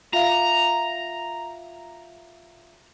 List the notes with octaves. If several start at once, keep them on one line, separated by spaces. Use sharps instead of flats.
F4 E5 F5 A#5